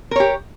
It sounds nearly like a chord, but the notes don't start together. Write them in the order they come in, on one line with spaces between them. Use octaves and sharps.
A#4 C#5 G4